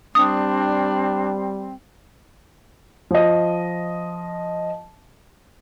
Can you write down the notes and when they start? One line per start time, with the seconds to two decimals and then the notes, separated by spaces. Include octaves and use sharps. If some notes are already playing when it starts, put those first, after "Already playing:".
0.15 G3 C4 D4 D#6
3.11 F3 D#5